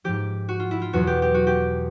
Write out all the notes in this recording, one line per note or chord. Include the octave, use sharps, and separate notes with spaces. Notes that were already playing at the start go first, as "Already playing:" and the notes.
G#2 F3 G4
F#4
F4
E4
F4
E2 B2 F#3 F#4
G4
G4
F#4
G4